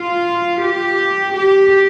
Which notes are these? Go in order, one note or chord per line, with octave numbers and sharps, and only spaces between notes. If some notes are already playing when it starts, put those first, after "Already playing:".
Already playing: F4
G4
G4